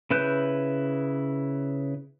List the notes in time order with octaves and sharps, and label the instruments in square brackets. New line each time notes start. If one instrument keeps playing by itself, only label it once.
[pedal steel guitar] C#3 E4 B4 F#6 G6